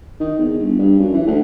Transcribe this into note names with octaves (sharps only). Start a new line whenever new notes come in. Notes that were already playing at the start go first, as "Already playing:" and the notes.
D#3
E2
G1
G2
F#2
E3
D2